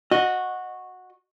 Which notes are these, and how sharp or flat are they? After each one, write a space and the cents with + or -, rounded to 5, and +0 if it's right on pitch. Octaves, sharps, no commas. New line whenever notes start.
F#4 -10 D#5 +0